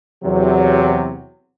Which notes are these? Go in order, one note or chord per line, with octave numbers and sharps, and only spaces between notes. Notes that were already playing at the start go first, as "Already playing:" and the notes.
E2 C3 F#3